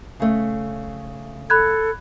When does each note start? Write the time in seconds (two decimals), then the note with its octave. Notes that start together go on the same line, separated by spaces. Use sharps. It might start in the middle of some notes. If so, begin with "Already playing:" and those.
0.20 C#3 A3
1.50 A4 B5 F#6 G#6